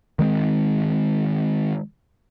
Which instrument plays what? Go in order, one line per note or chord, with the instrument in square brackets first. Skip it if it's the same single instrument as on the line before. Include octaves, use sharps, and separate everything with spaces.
[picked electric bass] D#3 G#3 B3 C4